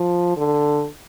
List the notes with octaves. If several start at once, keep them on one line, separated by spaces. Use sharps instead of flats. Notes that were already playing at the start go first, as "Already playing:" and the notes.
Already playing: F3
D3